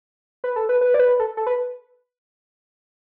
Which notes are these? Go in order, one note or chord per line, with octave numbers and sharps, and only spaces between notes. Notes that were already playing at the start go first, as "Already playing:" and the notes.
B4
A4
B4
B4
D5
B4
A4
A4
B4